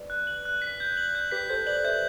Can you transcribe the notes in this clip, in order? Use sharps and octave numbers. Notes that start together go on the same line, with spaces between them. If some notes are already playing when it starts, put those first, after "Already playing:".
Already playing: B4 D5
F#6
F#7
F#6
B6
G6
F#7
G6
G4 B4 B6
A4 C5 G6
B4 D5 F#7
C5 E5 G6